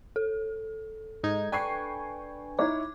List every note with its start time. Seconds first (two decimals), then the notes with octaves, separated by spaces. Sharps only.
0.16 A4
1.23 G#2 D#4 G#6
1.52 D4 B4 G5 G#5 C#6 C7
2.59 D#4 E4 C#5 D6 G#6